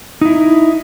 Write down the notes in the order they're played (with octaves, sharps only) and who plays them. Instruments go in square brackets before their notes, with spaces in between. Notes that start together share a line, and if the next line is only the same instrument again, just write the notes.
[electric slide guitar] D#4 E4